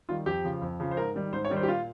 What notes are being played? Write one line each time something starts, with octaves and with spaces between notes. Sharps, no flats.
D#3 G3 F4
F2 G4
C#3 F3
F2
C#3 F3
C5
G#2 A#4
D#3 G3
G#2 C5
C#5
D#3 G3
C5
G4
A#2 F4